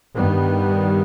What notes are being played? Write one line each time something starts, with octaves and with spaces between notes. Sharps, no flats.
G2 D#3 G3 B3